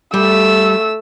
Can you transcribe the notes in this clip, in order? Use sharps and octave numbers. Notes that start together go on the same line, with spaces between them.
G3 A3 E6